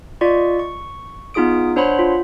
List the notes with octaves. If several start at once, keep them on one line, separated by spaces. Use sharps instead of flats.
F4 D5 D#5 C#6
C#6
B3 D#4 F4 G#4 D#6 D7
D4 C5 C#5 F#5 B5 C6
F4